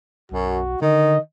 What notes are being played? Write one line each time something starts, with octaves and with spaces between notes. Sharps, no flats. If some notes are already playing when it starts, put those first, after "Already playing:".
B1 F#2 F#4
D3 D#3 D#5